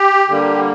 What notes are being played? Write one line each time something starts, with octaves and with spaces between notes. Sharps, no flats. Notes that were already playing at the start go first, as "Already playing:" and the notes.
Already playing: G4
D3 G3 A#3